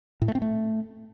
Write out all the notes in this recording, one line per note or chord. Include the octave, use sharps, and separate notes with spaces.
A2
A3
C4
A3